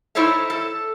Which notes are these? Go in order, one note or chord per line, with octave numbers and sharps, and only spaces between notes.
D#4 E4 A4 C5 C#5 E5
A4